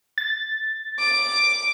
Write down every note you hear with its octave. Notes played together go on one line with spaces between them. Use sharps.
A6
D6